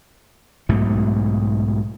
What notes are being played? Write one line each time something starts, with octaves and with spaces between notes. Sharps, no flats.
B1 G#2 B2 A3